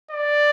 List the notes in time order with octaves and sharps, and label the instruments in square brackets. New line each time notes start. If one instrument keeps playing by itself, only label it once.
[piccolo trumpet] D5